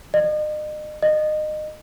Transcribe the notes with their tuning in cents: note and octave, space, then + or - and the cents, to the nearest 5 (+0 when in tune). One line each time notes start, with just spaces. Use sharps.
D#5 -40
D#5 -25